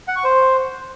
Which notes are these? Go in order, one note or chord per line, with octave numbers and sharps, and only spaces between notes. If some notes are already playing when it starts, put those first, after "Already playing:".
F#5
C#6
C5